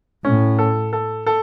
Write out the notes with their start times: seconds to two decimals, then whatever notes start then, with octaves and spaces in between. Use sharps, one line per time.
0.25 A2 C#4
0.59 A4
0.93 A4
1.26 A4